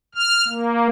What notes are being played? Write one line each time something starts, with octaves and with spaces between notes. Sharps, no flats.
F6
A#3